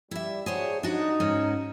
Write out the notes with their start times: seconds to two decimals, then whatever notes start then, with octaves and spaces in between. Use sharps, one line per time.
0.11 G3 E4 E5
0.46 D4 F#4 G#4 C5 C#5
0.83 D4 D#4 F#4
1.20 G#2 C#4 F#4